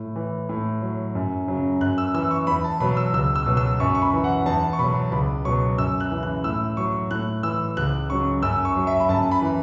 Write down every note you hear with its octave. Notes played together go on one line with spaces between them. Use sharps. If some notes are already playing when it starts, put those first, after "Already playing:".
Already playing: A2
E3
A2
F#3
F#2
C#3 F#3
F#2 F#6
E6
E3 E6
C#6
E2 B5
A5
B2 F#3 B5
E6
C#2 E6
E6
B2 F#3
E6
F#2 C#6
C#6
B5
E3
F#5
E2 A5
C#6
B2 F#3 B5
C#2 B5
B2 F#3 C#6
F#2 E6
F#6
C#3 E3
F#6
A2 E6
F#3 C#6
A2 F#6
E3 E6
C#2 F#6
C#3 F#3 C#6
F#2 E6
C#6
F#3
E5
B5
F#2 A5
B5
E3